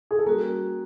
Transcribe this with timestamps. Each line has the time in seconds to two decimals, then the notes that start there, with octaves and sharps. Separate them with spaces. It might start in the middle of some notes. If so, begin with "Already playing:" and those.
0.11 G#4
0.19 A4
0.26 G3 A#3 C#4 F#4 G#4 A#4